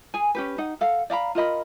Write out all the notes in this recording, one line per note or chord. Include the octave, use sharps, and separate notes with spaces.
G#4 G#5
C#4 G4 B4
D#4 F#5
A4 F5 F#5
D5 F5 A#5 B5
F4 A#4 D#5 B5